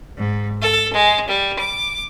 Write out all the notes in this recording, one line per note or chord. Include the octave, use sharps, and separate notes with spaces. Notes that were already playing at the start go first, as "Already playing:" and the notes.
G#2
A4
G#3
G3
D6